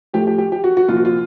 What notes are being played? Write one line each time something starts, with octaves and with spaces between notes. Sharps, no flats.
A2 F3 G4
G4
G4
G4
F#4
F#4
C2 A#2 F3 F4
F#4
F4